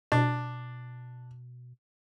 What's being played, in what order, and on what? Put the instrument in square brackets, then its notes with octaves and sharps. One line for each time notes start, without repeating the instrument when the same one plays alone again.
[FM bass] B2 [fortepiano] D4